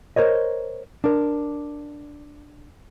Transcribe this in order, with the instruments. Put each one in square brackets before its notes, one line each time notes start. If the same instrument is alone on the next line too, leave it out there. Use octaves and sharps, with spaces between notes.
[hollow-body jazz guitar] A#4 C5 C#5 D#5
D4 A#4